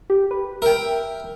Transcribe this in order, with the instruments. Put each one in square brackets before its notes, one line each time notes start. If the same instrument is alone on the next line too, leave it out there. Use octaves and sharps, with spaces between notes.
[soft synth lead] G4
B4
[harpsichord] A#4 G5 [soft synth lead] E5